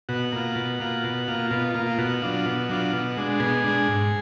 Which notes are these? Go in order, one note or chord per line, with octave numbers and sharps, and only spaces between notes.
B2 F#4
A#3 F4
B2
A#3 F4
B2
A#3 F4
B2 F4
A#3 F4
F4
B2 F#4
F#3 D4 F4
B2
F#3 D4 F4
B2
G#3 D4
B2 G#4
G#3 D4
G#2